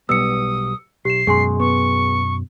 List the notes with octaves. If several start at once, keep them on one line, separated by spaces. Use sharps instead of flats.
B1 G3 B3 D#6 E6 C#7
B1 G4 C7 E7
F#2 B2 G#3 G#4 G#5 C6
B3 C#6